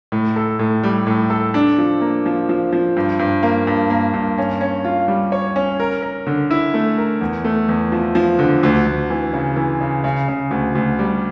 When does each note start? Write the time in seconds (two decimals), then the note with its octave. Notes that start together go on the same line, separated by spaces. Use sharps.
0.12 A2
0.36 A4
0.59 A2
0.83 G3
1.07 A2
1.30 A4
1.54 D4
1.78 F3
2.01 A#3
2.26 F3
2.49 F3
2.72 F3
2.97 G2
3.19 G2
3.43 A#3
3.67 G2
3.90 A#3
4.14 G2
4.38 C#4
4.61 C#4
4.85 F4
5.08 G3
5.32 C#5
5.56 C#4
5.80 A#4
6.02 A#4
6.27 D3
6.51 E4
6.74 A3
6.98 A#4
7.21 E2
7.44 A3
7.69 E2
7.92 F3
8.15 F3
8.39 D3
8.63 D2
8.87 D2
9.10 E3
9.33 C#3
9.56 E3
9.81 C#3
10.04 C#3
10.28 C#3
10.51 D2
10.75 D2
10.99 G3